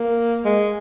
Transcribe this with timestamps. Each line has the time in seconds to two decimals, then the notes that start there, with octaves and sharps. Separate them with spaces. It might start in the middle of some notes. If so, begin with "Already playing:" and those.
Already playing: A#3
0.45 G#3